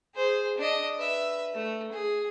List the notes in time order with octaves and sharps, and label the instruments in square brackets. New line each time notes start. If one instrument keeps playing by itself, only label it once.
[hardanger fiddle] G#4 C5
D4 D#5
B4 E5
A3
G#4